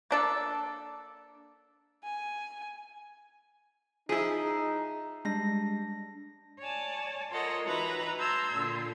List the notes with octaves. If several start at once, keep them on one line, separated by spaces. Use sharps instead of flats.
A#3 D4 A4
G#5
F3 D#4 E4 G#4
G3 G#3 D4 A#6
C#5 D5 G#5 A5
F4 A4 A#4 C#5 D#5 F#5
E3 D#4 F#4 B4 E5 A#5
A5 A#5 C6 E6 G6 G#6
A#2 D3 F4